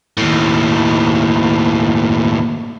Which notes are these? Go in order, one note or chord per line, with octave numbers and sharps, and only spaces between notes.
D#2 A2